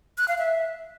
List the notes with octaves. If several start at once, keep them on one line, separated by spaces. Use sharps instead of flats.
F#6
F5
E5